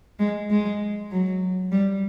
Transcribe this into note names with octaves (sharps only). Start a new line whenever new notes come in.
G#3
G#3
F#3
G3